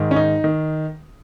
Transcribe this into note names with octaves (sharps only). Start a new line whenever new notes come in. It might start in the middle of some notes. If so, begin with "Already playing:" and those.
Already playing: G#2 D#3
C#4
D#4
D#3